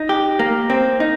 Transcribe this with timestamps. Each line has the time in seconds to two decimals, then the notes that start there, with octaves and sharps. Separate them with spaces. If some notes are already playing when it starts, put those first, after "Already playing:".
Already playing: D#4
0.09 G4
0.39 A#3
0.70 C4
1.00 D#4